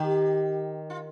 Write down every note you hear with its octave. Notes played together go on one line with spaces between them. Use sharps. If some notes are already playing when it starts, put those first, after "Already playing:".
Already playing: D#3 G4
F4